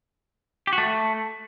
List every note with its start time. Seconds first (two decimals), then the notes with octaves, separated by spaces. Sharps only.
0.67 G4
0.73 F#4
0.78 A3